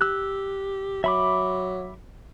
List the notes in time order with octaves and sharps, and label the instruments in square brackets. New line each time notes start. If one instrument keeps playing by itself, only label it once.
[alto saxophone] G4 [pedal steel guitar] E6 F#6
[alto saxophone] F#3 [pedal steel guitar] E5 B5 D6